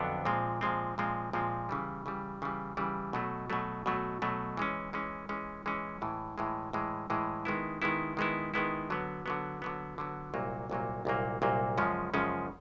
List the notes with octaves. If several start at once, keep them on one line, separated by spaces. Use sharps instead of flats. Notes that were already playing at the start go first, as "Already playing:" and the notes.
Already playing: F2 D3 F#3 B3 D4
A#2 F3 G#3 C4
A#2 F3 G#3 C4
A#2 F3 G#3 C4
A#2 F3 G#3 C4
C#3 E3 G3
C#3 E3 G3
C#3 E3 G3
C#3 E3 G3
B2 F#3 A3
B2 F#3 A3
B2 F#3 A3
B2 F#3 A3
E3 G#3 C#4
E3 G#3 C#4
E3 G#3 C#4
E3 G#3 C#4
A2 E3 G#3
A2 E3 G#3
A2 E3 G#3
A2 E3 G#3
D#3 G#3 B3 E4
D#3 G#3 B3 E4
D#3 G#3 B3 E4
D#3 G#3 B3 E4
D3 F#3 B3
D3 F#3 B3
D3 F#3 B3
D3 F#3 B3
C2 A#2 F#3 A#3
C2 A#2 F#3 A#3
C2 A#2 F#3 A#3
C2 A#2 F#3 A#3
F#2 C#3 F3 G#3 C#4
F#2 C#3 F3 G#3 C#4